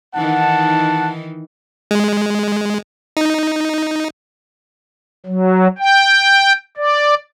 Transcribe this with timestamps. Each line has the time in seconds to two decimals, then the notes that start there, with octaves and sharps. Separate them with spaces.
0.15 D#3 E3 D#4 F#5 A5
1.91 G#3
3.17 D#4
5.26 F#3
5.78 G5
6.77 D5